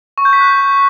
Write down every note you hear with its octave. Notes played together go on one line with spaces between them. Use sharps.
C#6
G6
B6
F#6